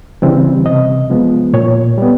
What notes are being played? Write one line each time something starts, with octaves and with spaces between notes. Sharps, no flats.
C#3 E3 G3 C4
C3 D#5
F3 G#3 B3
A#2 C#5
G3 B3